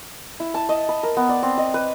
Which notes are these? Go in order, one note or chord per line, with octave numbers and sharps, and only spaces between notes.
E4
A5
D#5
B5
A#4
B3
D5
C4
D#5
B4